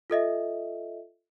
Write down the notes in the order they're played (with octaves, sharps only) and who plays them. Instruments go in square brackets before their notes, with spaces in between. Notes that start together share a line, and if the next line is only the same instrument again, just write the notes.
[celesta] F4 A4 D#5 E5